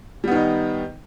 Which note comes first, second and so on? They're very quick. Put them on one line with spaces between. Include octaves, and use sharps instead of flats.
G3 B3 D#3 D#4